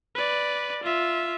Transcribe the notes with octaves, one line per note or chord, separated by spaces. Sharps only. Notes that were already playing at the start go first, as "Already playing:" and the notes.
B4 D5
F4 E5